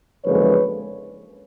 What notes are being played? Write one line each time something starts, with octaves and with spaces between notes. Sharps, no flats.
F#1 F2 D3 F3 G#3 B4 C#5